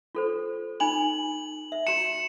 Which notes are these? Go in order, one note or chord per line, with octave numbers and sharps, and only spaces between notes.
F4 A4 C5
D#4 G#5 B5 F#7
E5
F#4 A#5 C#7 E7